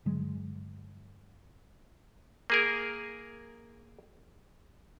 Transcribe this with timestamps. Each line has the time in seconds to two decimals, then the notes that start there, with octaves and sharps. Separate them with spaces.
0.05 G2 D3 F#3 G#3
2.50 A#3 G#4 A#4